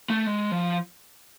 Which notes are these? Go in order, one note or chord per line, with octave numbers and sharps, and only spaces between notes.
A3
G#3
F3